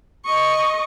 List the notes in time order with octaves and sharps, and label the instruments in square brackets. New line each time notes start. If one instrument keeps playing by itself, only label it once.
[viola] D#5 C#6